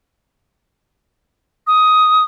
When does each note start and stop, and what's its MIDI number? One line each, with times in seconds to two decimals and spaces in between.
1.67 2.24 87